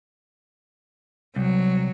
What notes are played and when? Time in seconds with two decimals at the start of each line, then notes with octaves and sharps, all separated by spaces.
1.36 C2 F#3